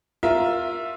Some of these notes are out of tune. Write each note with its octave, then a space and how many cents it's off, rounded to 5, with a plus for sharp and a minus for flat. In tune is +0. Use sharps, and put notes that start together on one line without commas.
F4 +15 A#4 +5 E5 +0